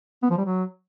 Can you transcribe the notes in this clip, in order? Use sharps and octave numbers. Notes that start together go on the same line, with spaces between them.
B3
F3
G3
F#3